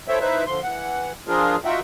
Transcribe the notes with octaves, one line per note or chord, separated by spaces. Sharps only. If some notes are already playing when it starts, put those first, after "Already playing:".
E4 A4 C5 C#5 E5 G5
D#4 E4 B4 C5 E5
D3 F3 C6
E3 F#5
F3 D4 F4 G#4 A#4
D#4 F4 F#4 E5 F#5 G5